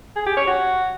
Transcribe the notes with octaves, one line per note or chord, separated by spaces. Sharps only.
G#4
G4
C#5
F#4